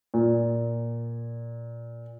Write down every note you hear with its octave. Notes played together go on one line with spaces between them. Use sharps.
A#2